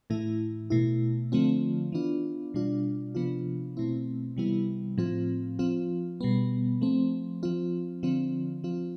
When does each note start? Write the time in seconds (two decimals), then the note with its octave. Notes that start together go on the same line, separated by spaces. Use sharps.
0.10 A2 E3 A3 E4
0.70 B2 A3 E4
1.32 D3 F3 A3 C4 F4
1.92 E3 B3 D4 F4
2.54 B2 G3 D4 F4
3.15 C3 F3 B3 D4 F4
3.77 B2 A3 C4 E4
4.37 C3 E3 G3 B3 E4
4.98 A2 F3 C4 F4
5.59 F3 C4 F4
6.21 B2 G3 B3
6.81 F3 A3 C4
7.43 F3 C4 F4
8.03 D3 F3 C4 F4
8.64 F3 C4 F4